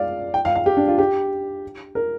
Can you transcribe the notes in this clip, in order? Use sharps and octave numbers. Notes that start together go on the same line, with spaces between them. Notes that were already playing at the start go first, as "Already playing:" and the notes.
Already playing: D5 F5
G5
F5
F5
G4
D4
F4
G4
A#4